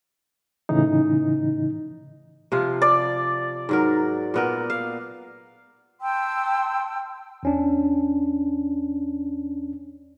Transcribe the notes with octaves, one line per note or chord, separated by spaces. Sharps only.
A2 C#3 E3 D#4
C3 F3 F4
D5
G#2 F#3 A#4
A#2 B3 A#4
F5
G5 A5 C6 E6
E2 C#4 D4